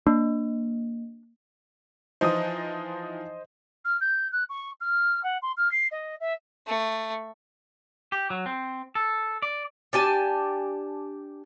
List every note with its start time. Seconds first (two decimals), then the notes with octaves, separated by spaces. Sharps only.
0.07 A#3 D4
2.21 E3 F3 D#4 C5 D#5 D#6
3.85 F6
4.01 G6
4.32 F#6
4.49 C#6
4.81 F6
5.23 F#5
5.42 C6
5.57 F6
5.71 C7
5.91 D#5
6.20 E5
6.67 A3
8.12 G4
8.30 F#3
8.46 C4
8.95 A4
9.42 D5
9.93 D4 G4 G#5 A5